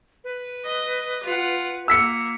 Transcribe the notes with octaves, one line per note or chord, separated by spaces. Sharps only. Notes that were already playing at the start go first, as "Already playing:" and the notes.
B4
D#5
F4 F#5
A#3 E6 B6 C#7